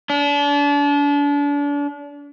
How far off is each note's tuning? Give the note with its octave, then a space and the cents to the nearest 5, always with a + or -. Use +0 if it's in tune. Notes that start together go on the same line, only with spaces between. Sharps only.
D4 -35